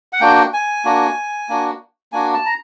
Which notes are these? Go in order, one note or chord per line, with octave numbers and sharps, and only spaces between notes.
F#5
A#3 D4 F#4 G5
G#5
A#3 D4 F#4
A#3 D4 F#4
A#3 D4 F#4 G#5
A5
A#5